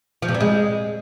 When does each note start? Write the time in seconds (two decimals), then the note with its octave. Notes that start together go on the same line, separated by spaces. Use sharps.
0.22 F3
0.28 C3
0.34 G3
0.40 G#3